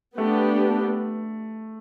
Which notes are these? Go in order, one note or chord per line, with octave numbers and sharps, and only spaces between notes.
A3 B3 D4 G4